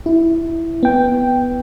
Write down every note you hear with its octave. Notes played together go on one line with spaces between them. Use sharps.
E4
B3 G5